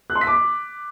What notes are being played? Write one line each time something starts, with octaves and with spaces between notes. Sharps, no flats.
F#6
C6
B6
D6